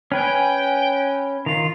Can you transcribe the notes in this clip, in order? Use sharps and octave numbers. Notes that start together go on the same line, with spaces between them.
C#4 B4 G5 G#5
D#3 F4 F7